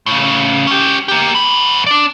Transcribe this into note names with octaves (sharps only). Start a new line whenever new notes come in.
A2 C#3
C#4 G4
A#3 G4
F#2 B5
D4 D5